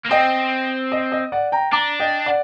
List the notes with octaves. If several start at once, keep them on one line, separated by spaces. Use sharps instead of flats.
A#3
C4 D#5 G5
D#5
D#5
D5 F#5
G5 A#5
D4 A#5 D6
D#5 G5
D5 F#5